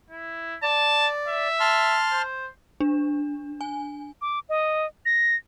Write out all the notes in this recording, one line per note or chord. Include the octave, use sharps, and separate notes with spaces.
E4
D5 A5
E5
A5 C6 F6
C5
D4
G#5
D6
D#5
A#6